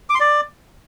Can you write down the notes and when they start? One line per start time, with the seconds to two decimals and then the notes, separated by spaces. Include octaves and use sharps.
0.10 D6
0.15 C6
0.20 D5